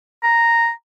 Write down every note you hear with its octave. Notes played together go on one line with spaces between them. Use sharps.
A#5